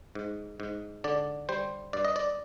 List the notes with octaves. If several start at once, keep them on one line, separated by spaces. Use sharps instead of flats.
G#2
G#2
D3 D5
G3 C5
G2 D5
D#5
D5